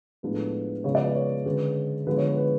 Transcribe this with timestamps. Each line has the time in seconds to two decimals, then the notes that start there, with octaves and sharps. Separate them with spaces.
0.23 A2 F3 G#3 B3 D4 B4
0.34 A4
0.84 C#3 F3 G#3 B3 C#5
0.95 D5
1.05 B4
1.15 C#5
1.46 D3 G#3 C#4 B4
2.07 D3 F3 G#3 B3 B4
2.17 C#5
2.27 B4
2.37 B4